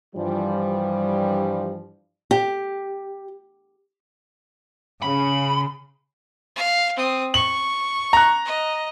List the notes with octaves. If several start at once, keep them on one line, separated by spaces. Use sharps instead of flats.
G2 E3 F3 G3
G4
C#3 B5
F5
C4 D#6
C#6 F#7
A#5 F#6
D#5